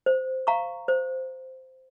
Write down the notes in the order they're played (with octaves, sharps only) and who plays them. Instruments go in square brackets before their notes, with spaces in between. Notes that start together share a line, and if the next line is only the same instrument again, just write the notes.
[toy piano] C5
F5 A#5 C#6
C5